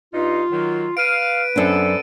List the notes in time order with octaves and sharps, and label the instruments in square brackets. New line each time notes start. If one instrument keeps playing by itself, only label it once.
[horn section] G2 D#4 [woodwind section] F4
[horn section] D#3 F#3
[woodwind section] B4 [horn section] F5 [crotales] D7 D#7
[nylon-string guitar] F#2 C4 D4 [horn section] B3 A4